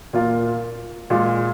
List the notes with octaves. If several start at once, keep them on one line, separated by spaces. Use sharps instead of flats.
A#2 A#3 F4
A#2 G#3 F4